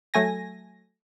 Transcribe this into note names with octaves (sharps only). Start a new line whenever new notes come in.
F#3 A3 G#5 A#6